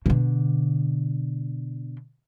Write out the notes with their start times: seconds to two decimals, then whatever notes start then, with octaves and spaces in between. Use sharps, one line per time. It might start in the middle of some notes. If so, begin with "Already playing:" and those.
0.06 B2 D3